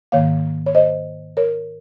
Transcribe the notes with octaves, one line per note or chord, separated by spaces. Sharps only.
G#2 D#3 A#3 C#5 F5
C#5
C5 D#5
A#4 C#5